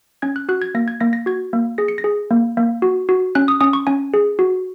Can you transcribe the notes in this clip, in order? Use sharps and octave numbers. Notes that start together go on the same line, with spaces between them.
C#4 G#6
F#6
F#4 F#6
G#6
A#3 A#6
G#6
A#3 A#6
A#6
F#4 G#6
A#3
G#4 A#6
C#7
A#6
G#4
A#3
A#3
F#4
F#4
C#4 F#6
D#6
C#4 D#6
C#6
C#4 G#5
G#4
F#4